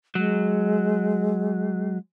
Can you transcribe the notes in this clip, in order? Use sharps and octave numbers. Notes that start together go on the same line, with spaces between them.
F#3 G#3